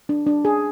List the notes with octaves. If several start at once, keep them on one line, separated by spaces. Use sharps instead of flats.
D4
D4
G#4